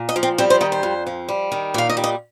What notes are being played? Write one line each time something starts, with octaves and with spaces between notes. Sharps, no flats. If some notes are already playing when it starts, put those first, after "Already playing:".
Already playing: A#2
D#5
F3
C4
G3 C4
C5
D#3 D#5
C5
F2
F3
G3
D#3
A#2 F5
D#5
G3
D#5